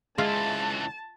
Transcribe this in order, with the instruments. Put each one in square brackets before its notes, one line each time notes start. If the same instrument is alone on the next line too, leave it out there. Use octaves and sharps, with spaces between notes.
[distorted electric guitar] C#2 E3 [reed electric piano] G#3 E5 C6 [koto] F4 [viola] A5